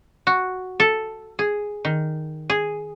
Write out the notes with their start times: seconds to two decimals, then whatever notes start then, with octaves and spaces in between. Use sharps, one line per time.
0.27 F#4
0.80 A4
1.39 G#4
1.85 D#3
2.50 G#4